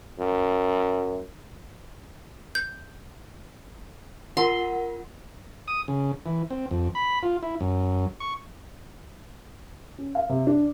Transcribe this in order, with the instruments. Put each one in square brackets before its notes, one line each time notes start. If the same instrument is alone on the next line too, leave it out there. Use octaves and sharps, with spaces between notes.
[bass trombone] F#2
[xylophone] G6
[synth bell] F4 A#4 F#5 [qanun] C6
[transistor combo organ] D#6
C#3
E3
C4
F2
B5
F4
E4
F#2
C#6
[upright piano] C#4
F5
C3
D4